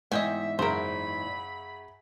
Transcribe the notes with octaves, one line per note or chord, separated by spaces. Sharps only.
E2 G#2 D#5 E5 G5 G#5
F#2 C#3 A#4 C5 B5